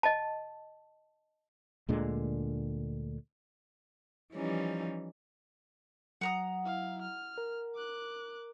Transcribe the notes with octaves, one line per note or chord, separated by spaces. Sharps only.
D#5 A5
D2 A#2 D3 G#3
E3 F3 G3 C#4 D#4
F#3 F#5 A#5 D#6
E4 F5
F6
A#4
D6 F#6